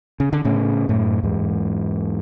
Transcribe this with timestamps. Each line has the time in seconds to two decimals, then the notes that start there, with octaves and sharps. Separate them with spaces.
0.20 C#3
0.33 D3
0.45 A2 C#3
0.89 F#2 A2
1.23 E2 G#2